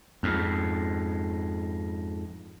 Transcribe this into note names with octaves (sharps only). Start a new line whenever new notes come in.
F2 G#2